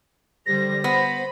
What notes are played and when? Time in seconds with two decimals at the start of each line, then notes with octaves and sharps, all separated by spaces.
0.46 D3 G3 C5 A#6
0.84 B3 C5 B5